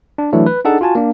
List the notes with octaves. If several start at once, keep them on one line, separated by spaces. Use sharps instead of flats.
D4
E3 F#3 A3 D4 E4
B4
D4 D#4 G#4 A4 F#5 A5
F4 F#4 G#5 A5
A#3 D4